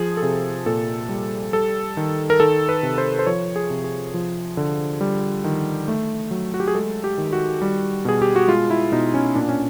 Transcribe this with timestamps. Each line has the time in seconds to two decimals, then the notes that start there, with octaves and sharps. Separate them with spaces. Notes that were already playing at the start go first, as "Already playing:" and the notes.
Already playing: F3 G#4
0.17 A4
0.22 C3 G#4
0.66 A#2 A4
1.09 G3
1.53 G3 A4
1.97 D#3
2.30 A#4
2.40 D#3 A4
2.69 B4
2.83 C3
2.98 C5
3.19 C5
3.27 F3 C#5
3.56 G#4
3.70 C3
3.84 G#4
4.14 F3
4.57 D3
5.01 G3
5.44 D#3
5.88 A3
6.31 F#3
6.54 F#4
6.60 G4
6.68 G#4
6.75 G#3 A4
7.04 G4
7.18 D#3
7.33 F#4
7.62 G3
8.05 B2 G#4
8.22 G4
8.36 F#4
8.48 G#3 F4
8.70 E4
8.92 B2 D#4
9.14 C#4
9.35 A#2 D4
9.49 C#4